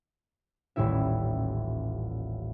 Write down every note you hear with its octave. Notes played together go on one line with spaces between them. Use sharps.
D#1 A1 G3 E4 E5